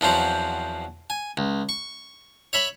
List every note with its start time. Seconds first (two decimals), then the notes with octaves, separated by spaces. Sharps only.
0.01 E2 F3 F#3 C4
1.10 G#5
1.37 C#2
1.69 C#6
2.53 C#5 E5 B5